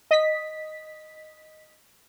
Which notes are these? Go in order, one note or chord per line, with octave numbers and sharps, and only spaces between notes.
D#5 B6